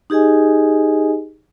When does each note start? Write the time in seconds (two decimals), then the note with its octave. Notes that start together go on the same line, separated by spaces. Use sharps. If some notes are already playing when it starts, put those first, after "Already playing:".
0.10 D#4 G4 G#4 D#5 G#5